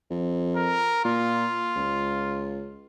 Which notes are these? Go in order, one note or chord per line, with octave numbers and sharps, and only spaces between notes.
F2
A#4
A#2 F4
C#2